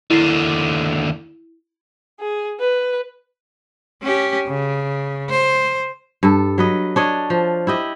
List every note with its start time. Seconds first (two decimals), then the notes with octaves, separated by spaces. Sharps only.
0.10 D#2 D3 E4 C7
2.20 G#4
2.60 B4
4.03 C#4 G4
4.47 C#3
5.30 C5
6.23 G2 A4
6.58 F#3 B4 D#5
6.96 D4 C#5 D#5
7.30 F3
7.67 E4 G4 D#5